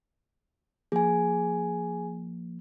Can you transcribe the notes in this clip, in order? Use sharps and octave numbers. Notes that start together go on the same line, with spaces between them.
F3 A#3 G#4 G#5